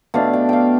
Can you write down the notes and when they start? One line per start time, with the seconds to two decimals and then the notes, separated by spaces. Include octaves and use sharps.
0.14 B2 A3 D4 F5
0.33 G5
0.49 F5 G5